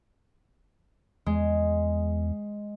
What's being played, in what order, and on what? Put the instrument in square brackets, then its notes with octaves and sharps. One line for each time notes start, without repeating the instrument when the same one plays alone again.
[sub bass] E2 [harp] G#3